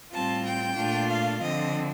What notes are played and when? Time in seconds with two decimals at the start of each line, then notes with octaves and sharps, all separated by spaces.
0.13 A2 G3 C4 F4 A5
0.45 G5
0.77 A#2 A3 D4 F4
1.10 F5
1.41 D3 F3 C4 D#5